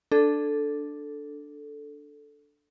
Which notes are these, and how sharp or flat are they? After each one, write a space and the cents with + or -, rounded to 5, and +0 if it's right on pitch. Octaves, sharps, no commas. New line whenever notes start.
D4 +0 A4 +0